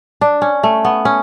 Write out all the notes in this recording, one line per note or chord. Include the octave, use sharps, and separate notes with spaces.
D4
C#4
A3
B3
C#4